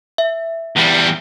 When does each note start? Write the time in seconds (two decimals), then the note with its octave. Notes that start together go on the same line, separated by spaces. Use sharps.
0.18 E5
0.76 E2 G3